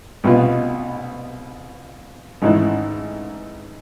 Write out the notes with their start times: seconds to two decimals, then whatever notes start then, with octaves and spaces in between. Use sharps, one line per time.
0.24 C2 B2 B3 F4
2.42 G#1 G#2 E3